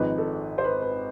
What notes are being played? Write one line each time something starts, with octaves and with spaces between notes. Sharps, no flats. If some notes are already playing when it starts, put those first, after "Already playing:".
Already playing: G#1 G#2 F3 B4
A4
C5
B4
B4